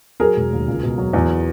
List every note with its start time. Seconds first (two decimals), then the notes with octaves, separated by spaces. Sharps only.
0.20 F#3 G#4 A#4
0.36 E1
0.52 D#2
0.68 C#2
0.83 B2
0.98 F#3
1.13 E2